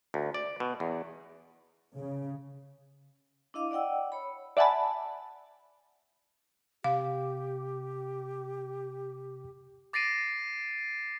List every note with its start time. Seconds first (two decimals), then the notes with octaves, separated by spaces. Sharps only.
0.14 D2
0.34 D5
0.60 B2
0.80 E2
1.97 C#3
3.54 D4 E4 D#5 F5 D6
3.71 D5 D#5 F#5 G5 E6
4.12 C#5 B5
4.57 D5 E5 F#5 G#5 A5 B5
6.84 C3 G4 F5 D6
9.93 D6 A6 A#6 C7 D7 D#7